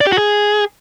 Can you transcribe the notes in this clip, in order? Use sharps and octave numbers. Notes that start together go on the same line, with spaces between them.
D5
G4
F#4
G#4